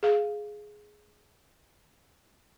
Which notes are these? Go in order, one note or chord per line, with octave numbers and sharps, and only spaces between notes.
G#4 F5